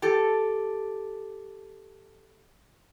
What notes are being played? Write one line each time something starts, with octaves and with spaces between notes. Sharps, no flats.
G4 A4